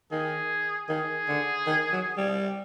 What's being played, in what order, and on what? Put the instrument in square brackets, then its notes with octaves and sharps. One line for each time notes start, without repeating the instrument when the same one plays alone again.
[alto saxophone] D#3 [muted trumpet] G#4
[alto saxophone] D#3 [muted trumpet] G#4
[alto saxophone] D3
D#3
F#3
G3